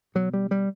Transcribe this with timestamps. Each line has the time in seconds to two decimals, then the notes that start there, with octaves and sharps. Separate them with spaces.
0.15 B2 F#3
0.34 G3
0.51 G3